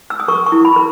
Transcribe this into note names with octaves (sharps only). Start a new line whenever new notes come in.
E6
D#6
A#4 C#6
C#6
E4
B5
A#4